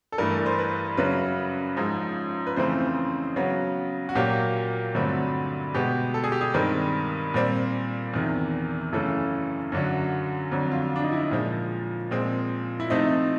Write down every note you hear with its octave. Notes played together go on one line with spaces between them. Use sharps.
A4
G2 E3 A3 A#4
C5
B4
F#2 C#3 F#3 B4
G#2 F3 G#3
B4
F2 C#3 E3 A3 C4 C5
C#3 F#3 B3
F#4
A#2 F#3 A#3 G4
G2 D3 F#3 A3 C4
B2 G#3 B3 G4
A4
G#4
G4
G#4
G2 D#3 G#3 C4 A#4
A#2 G3 C4
E2 C3 D#3
F#2 C#3 E3 A3 A4
F#2 D3 F#3
F2 D3 F#3
F4
D4
D#4
E4
A#2 F3 G#3
A#2 F3 G#3 C4
E4
C3 F3 A3 C4 D#4